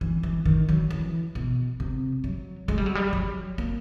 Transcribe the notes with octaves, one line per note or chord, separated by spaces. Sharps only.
E3
E3
D#3
F#3
E3
B2
C3
F#3
G#3
G3
F#3
G3
F#3
A#3